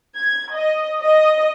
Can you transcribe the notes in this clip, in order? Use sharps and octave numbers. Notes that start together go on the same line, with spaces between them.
G#6
D#5
D#5